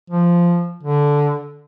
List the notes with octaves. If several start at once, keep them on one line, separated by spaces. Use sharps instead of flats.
F3
D3